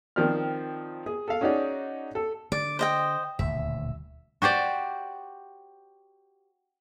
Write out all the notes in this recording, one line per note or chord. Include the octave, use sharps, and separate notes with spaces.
D#3 F3 C4 D5 F6
G#4
A4 F5
C#4 D#4 F#4 G#4 D5
A4
D3 D5
C5 D#5 G5
D#1 D2 B2 E5
F#4 G4 C5 D5